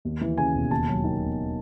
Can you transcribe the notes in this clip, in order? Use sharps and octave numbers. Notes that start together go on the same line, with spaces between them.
D#2
E3
C#3 G#5
E1
D#2 A5
F#3
D#3
E1